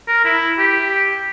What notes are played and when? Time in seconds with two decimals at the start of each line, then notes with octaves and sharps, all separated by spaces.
0.08 A#4
0.25 E4
0.59 G4